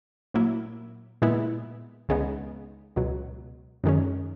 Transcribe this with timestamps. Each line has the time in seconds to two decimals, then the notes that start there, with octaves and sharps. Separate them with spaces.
0.34 A#2 F#3 A#3 E4
1.22 A#2 G#3 B3 E4
2.09 C#2 C#3 G#3 B3 D#4
2.96 C#2 B2 F#3
3.84 F#2 D#3 G#3 C#4